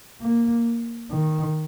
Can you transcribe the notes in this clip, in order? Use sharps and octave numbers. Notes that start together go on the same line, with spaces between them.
A#3
D#3